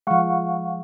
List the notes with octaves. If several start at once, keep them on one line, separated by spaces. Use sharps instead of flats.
F3 G#3 F5 F#5 C#6